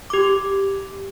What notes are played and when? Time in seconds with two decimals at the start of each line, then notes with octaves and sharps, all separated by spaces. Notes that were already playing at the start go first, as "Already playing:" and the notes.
0.10 G4 D6